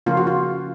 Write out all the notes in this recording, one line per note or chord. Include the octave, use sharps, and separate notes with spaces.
C#3 F3 A#3 C#4 F4
F#4
F4